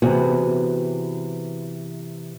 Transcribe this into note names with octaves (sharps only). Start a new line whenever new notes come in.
C3 E3 B3 F#4 G#4